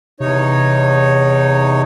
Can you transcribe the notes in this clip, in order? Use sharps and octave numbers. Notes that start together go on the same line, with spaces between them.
E2 C3 D#4 C#5